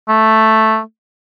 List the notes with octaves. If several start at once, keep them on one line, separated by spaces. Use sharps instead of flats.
A3